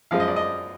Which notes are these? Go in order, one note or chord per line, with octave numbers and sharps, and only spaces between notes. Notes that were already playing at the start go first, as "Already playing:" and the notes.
F#2 F3 G#3 F5
D#5
D5
D#5